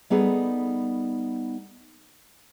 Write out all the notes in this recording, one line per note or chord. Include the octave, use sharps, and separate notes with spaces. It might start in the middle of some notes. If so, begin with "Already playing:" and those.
G3 B3 D#4 G#4 A4